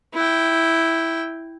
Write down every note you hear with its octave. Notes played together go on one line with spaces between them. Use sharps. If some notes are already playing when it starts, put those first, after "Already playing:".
E4 G5